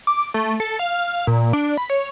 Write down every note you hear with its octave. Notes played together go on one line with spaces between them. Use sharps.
D6
A3
A4
F5
A#2
D4
B5
C#5